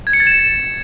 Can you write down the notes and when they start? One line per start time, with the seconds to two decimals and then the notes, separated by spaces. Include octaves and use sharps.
0.07 G#6
0.13 C#7
0.20 A6
0.27 E7